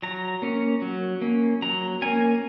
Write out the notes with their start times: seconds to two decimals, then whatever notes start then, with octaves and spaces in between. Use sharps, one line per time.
0.02 F#3 A#5
0.42 A#3 C#4
0.82 F#3
1.21 A#3 C#4
1.62 F#3 A#5
2.02 A#3 C#4 G#5